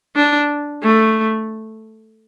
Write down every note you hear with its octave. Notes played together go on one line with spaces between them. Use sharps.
D4
A3